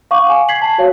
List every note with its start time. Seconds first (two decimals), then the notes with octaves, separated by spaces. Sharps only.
0.11 F5 F#5 C#6 D6
0.30 G#5
0.49 G#6 B6 C7 F#7
0.62 A5
0.78 F#4 C#5 F5